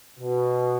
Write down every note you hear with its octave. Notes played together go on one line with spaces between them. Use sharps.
B2